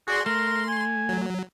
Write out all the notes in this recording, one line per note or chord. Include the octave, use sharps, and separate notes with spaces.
F#4 G#4 D5 C6
A3 A#4 C6
G#5
F#3